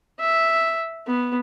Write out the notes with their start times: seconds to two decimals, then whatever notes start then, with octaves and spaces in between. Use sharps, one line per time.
0.20 E5
1.07 B3